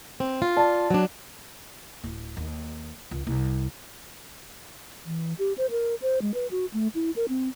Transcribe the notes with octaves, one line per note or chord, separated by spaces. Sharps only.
C4
F4
D5 A5
F#3 D4
D1
D#2
C#2
C2
E3
G4
C5
A#4
C5
G#3
B4
F#4
A3
E4
A#4
C4